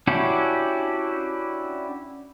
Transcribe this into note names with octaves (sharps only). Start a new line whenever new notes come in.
C#4 D4 E4 F#4 G4